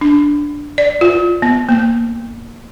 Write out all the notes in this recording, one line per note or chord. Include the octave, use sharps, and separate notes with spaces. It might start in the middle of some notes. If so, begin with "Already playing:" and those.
D4
D5
F4
B3
A#3